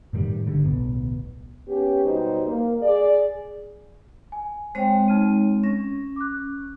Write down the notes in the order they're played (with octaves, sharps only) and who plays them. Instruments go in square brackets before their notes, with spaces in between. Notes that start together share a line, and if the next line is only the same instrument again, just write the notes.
[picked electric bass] A2 D#3 F#3 G3
G1 D3 G3
D1 B1 B3
[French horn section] B3 C#4 G4
B2 F#3 G3 D#4 C5
A#3
G#4 D5
[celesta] G#5
[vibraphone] G#3 C4 C#5 [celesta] C5 G5
[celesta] D#4 F6 D#7
[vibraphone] C#4 [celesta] A#6
[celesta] D6 F#6